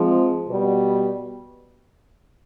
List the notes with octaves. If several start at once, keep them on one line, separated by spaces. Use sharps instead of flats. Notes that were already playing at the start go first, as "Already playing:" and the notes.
Already playing: F3 G#3 C4
B2 G3 B3